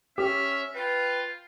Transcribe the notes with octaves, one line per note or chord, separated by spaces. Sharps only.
C#4 G4 E5 F6
F4 B4 G5